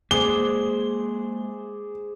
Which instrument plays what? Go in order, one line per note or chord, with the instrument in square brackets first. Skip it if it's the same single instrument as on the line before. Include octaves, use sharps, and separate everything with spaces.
[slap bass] G#3 A#3 [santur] G#4 C5 D5 [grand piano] G7